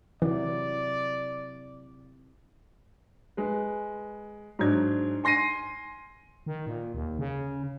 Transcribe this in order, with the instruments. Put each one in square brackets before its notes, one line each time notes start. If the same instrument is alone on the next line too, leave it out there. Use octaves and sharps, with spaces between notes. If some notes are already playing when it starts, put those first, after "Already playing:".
[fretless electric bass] C3 F#3 [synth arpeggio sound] E3 [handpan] E4 [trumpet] D5
[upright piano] G#3 B4
G#2 F#3 D4 G#6
G#5 C6 A#6 C7 D#7
[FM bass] D#3
A#2
D#2
C#3